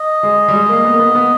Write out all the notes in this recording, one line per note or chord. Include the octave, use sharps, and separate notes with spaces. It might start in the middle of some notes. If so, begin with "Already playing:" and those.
Already playing: D#5
G#3
G3
G#3
A#3
B3
A#3
B3
B3